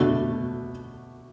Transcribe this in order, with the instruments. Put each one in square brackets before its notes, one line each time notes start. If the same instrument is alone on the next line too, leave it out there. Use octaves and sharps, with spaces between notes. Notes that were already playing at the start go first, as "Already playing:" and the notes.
Already playing: [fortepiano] B2 A3 D4 F#4